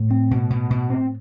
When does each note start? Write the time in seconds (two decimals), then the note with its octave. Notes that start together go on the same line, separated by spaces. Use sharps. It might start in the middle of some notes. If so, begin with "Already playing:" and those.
Already playing: A2
0.10 C4
0.31 B2
0.50 B2
0.70 B2
0.90 C4